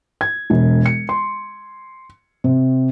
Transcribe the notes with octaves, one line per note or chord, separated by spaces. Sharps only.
G#6
E1
C#7
C6
C3